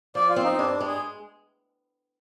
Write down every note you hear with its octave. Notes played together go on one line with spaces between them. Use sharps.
F3 D5
F4
C4
D#4
G2 D4
D4
G#3
G#4